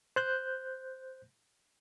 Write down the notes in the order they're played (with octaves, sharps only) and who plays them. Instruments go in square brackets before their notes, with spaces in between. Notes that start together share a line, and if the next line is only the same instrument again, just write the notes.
[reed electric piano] C5 F#6 G6